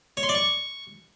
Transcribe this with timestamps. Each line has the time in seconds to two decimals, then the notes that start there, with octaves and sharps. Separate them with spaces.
0.17 C#5
0.23 C6
0.29 D5
0.35 C#6